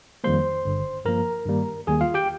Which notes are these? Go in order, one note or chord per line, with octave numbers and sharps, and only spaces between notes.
F2 D#3 G3 A#3 C5 C6
G1 G2 D3
G2 F3 A#3 A#4 A#5
G2 D#3 G3 A#3
D#2 D#3 G3 A#3 G#4 G#5
F4 F5
G4 G5